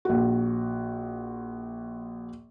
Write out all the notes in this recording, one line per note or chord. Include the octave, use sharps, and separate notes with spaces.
A#1 F#4